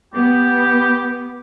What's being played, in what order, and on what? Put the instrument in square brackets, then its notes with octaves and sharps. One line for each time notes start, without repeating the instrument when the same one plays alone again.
[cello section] B3 [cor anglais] G4